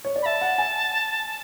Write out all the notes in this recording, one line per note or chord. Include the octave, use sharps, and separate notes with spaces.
C#5
D5
B5
E5 A5
F#5
G#5